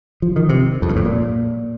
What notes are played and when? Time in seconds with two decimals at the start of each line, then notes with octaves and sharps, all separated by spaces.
0.22 F3
0.36 D#3
0.49 C3
0.82 F2
0.89 G2
0.96 A2
1.05 A#2